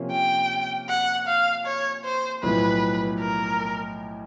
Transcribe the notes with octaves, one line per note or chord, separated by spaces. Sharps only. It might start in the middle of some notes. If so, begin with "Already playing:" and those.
Already playing: C3 F3 A#3 C#4
G5
F#5
F5
C#5
C5
B1 A2 F3 B4
A#4